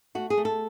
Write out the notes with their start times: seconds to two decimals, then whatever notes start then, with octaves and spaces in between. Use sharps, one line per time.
0.15 A3 F#4
0.30 G#4
0.38 A3
0.45 A4